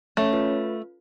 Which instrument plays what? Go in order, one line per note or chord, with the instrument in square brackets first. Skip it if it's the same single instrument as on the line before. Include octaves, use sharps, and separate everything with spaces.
[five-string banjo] A3 [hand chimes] C#4 C#5
[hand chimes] F4 B4